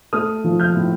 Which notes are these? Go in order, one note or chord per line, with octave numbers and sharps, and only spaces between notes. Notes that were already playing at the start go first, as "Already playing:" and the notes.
A3 D#6 F6
F3
F6 G6
A2